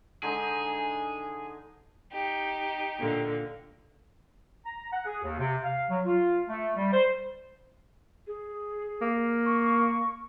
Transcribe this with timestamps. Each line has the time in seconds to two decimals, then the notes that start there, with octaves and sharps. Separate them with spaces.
0.23 D3 G#3 D#4 G#4
2.12 D#4 G4
3.00 A#2 D3 A#3
4.65 A#5
4.92 F#5
5.05 G#4
5.24 D#2
5.39 C3
5.64 F5
5.90 F#3
6.06 F4
6.48 A3
6.76 G3
6.92 C5
8.27 G#4
9.01 A#3
9.45 C#6